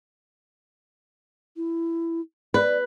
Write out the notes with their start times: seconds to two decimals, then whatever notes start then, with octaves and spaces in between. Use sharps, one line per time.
1.57 E4
2.54 B4 D5